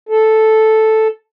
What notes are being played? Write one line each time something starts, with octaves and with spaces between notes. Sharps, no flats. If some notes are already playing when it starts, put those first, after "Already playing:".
A4